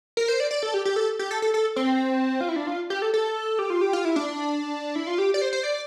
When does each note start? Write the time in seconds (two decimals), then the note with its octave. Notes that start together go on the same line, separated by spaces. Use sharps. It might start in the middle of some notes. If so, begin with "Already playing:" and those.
0.17 A#4
0.28 C5
0.40 D5
0.51 D5
0.63 A4
0.74 G4
0.85 G4
0.96 A4
1.19 G4
1.31 A4
1.42 A4
1.54 A4
1.76 C4
2.41 F4
2.49 E4
2.56 D4
2.67 F4
2.90 G4
3.02 A4
3.14 A4
3.59 G4
3.70 F4
3.81 G4
3.93 F4
4.05 E4
4.16 D4
4.96 E4
5.07 F4
5.18 G4
5.34 D5
5.42 C5
5.53 C5
5.63 D5